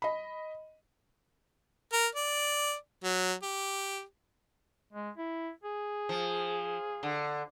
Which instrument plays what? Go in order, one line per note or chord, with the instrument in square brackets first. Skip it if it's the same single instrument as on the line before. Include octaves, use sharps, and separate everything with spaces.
[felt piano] D#5 B5
[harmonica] A#4
D5
F#3
G4
[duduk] G#3
E4
G#4
[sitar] F3
D3